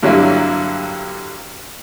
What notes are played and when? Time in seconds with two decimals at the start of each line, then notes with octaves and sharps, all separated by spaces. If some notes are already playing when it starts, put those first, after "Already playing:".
0.03 G2 D3 F#3 G3 A#3 E4